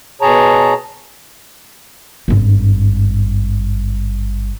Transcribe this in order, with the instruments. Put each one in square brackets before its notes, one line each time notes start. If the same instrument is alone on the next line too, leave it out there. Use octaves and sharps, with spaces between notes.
[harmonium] B2 G#4 C#5 A5 A#5
[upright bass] G#1 G2